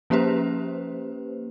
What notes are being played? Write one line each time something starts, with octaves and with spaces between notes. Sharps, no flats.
F3 A#3 C#4 G4 B4 C5